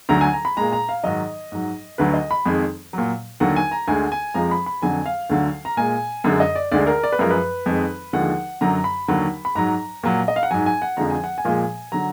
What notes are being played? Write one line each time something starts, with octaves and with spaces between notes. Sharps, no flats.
D2 D3 F#3 A#5
G#5
A#5
B5
A#2 G#3 A#5
A#5
F5
G#2 D#3 F#3 D#5
G#2 F#3
D2 D3 F#3 B4
D#5
B5
F2 D#3 G#3
A#2 F#3
D#2 D3 F#3 F#5
G#5
A#5
D2 D3 G#3 G#5
G#5
F2 F3 G#3 A#5
B5
B5
F2 D3 F#3 G#5
F5
D2 D3 F#3
A#5
A#2 G#3 G#5
F#2 D3 G#3
D#5
D5
D2 D3 G#3 D5
A#4
D5
B4
F#2 F3 G#3 A#4
B4
F2 D#3 G#3
D#2 D3 F3 G#3 F#5
F#2 D3 F#3 A#5
B5
D#2 D3 F#3
B5
G#2 F#3 A#5
A#2 F#3
D#5
F5
F#5
G#2 F#3 G#5
G#5
F#5
F2 D3 F3 G#3 A#5
G#5
F#5
G#5
A#2 F3 G#3
D3 F#3 A#5